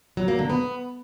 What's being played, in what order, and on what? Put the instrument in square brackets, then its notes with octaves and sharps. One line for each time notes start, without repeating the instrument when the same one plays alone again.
[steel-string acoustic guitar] F#3
A#3
D3
B3